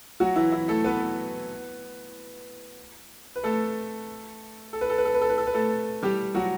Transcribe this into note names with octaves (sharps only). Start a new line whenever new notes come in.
F#3 F#4
E3 E4
E3 E4
A3 A4
B3 B4
B4
A3 A4
A4
B4
A4
B4
A4
B4
A4
B4
A4
B4
A3 A4
G3 G4
F#3 F#4